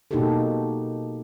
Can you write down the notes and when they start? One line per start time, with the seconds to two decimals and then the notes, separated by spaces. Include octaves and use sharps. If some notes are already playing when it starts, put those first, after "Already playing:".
0.11 B2 A#3 D#4 F#4 G4 A4